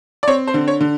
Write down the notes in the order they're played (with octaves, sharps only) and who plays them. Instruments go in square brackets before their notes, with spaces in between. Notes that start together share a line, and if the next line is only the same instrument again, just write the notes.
[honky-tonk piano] D5
C4 C#5
C5
D3
C#5
D3